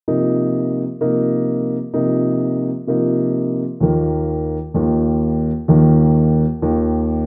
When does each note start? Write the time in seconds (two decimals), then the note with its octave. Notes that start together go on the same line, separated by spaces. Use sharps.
0.08 C3 F3 A#3 D#4
1.01 C3 F3 A#3 D#4
1.94 C3 F3 A#3 D#4
2.87 C3 F3 A#3 D#4
3.81 D#2 D#3 A#3 F4
4.74 D#2 D#3 A#3 F4
5.68 D#2 D#3 A#3 F4
6.61 D#2 D#3 A#3 F4